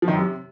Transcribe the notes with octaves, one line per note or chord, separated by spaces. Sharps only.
F3
D#3
F#2
C3